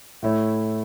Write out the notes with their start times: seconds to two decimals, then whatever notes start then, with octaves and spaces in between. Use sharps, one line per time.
0.22 A2 A3 E4 C#5